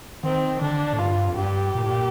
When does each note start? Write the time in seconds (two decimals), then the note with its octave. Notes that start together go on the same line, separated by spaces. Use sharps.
0.23 D#3 C4
0.62 D3 D4
0.93 A2
0.99 G2 F4
1.28 F2
1.37 G2 G4
1.75 A#2
1.83 A2
1.91 A#2